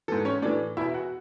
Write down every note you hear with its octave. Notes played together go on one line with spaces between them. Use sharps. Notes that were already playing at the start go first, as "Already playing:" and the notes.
G#2 E3 A4
C#4 C#5
A2 E3 D4 D5
E2 B2 E4 E5
F#4 F#5